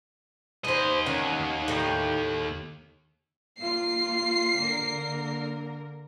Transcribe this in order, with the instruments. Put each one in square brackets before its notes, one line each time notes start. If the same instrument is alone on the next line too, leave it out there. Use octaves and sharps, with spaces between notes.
[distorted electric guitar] D#2 D#5 [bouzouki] B4 C5
[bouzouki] D#3 C#4 F#5
A2 D#4 G5
[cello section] A#3 F4 [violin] C7
[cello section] D3 A#3 A#4